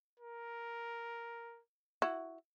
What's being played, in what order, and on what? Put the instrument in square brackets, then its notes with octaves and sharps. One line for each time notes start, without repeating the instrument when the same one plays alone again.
[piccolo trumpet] A#4
[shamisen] E4 F#4